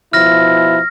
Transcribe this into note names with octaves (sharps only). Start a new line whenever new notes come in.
B2 F3 E4 F6 A#6